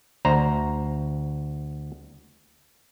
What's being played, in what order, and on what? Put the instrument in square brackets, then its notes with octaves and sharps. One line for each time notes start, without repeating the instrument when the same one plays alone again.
[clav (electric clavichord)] D2 C5 A#5